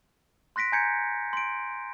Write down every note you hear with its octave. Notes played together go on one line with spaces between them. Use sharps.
C6 F#6 A#6 B6 D7
G#5 A#5 G6 G#6 C#7
C6 D7